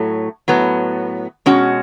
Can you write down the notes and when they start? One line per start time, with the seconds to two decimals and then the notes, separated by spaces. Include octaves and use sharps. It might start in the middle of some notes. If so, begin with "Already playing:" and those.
Already playing: A2 F#3 A3
0.48 A2 F#3 B3
1.46 B2 G#3 C#4 F#4